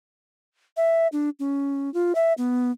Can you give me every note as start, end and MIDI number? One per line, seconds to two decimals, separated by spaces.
0.77 1.07 76
1.12 1.29 62
1.39 1.92 61
1.94 2.13 65
2.15 2.33 76
2.38 2.71 59